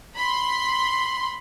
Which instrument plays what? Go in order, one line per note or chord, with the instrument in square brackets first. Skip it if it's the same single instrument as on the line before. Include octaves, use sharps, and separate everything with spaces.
[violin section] B5 C6